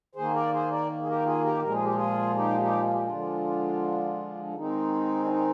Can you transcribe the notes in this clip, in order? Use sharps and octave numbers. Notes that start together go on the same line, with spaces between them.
D#3 A#3 G#4 C5
A#4 D5
G#4 C5
A#4 D5
G#4
G4 A#4
F4 G#4
G4 A#4
A#2 F3 G#3 A#4
G#4
G4
F4 G#4
D#4 G4
D#4 G4
F4
G4
D4 F4
D3 F3 G#3
D#3 G#3 C4 D#4
D4
D#4